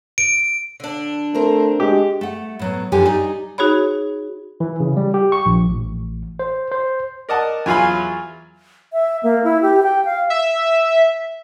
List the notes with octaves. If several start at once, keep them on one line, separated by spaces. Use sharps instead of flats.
D7
D3 D4
A3 C4 A#4 C5
G#3 G4
A3 F#5
A2 F#3 B3
F#2 D3 F3 G3 G4 G#5
D#4 D5 G#5
D#4 F#4 G#4 C#5 B5
E3
C#3
G3
G4
C#6
A#1
A1
C5
C5
A#4 D5 D#5 F#5 A5
E2 F#3 F4 F5 G#5 B5
E5
A#3
E4
G4
G5
F5
E5